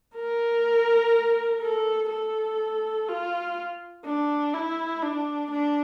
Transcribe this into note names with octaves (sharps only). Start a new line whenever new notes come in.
A#4
A4
A4
F4
D4
E4
D4
D4